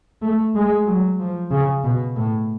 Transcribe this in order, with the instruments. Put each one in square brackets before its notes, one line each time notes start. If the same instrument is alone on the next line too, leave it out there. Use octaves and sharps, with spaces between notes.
[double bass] A3
G#3
F#3
F3
C#3
B2
A2